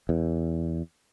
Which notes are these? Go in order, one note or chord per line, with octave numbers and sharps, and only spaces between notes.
E2